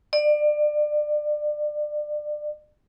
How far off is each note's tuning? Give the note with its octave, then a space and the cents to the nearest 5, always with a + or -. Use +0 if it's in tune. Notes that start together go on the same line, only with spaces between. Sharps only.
D5 +30